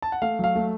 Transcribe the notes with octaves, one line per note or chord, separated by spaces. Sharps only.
A5
F#5
A3 F5
F#3 F5
A3